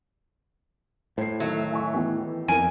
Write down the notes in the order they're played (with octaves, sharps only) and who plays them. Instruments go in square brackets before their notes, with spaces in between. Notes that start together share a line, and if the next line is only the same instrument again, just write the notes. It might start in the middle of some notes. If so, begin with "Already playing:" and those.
[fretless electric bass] A2 [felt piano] C5 C7
[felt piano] D#3 A3 [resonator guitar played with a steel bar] F#3 [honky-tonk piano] E5
[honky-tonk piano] E5 G#5 C#6
E3 B3 G4
[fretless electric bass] F2 [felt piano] A#4 D7 [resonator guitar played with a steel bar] G#5